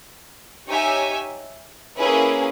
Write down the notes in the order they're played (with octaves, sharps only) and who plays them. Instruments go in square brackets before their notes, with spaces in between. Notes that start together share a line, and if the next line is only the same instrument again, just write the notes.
[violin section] D#4 G4 C#5 E5 G#5
A#3 C#4 E4 G#4 B4